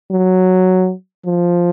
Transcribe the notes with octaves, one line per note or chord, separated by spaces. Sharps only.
F#3
F3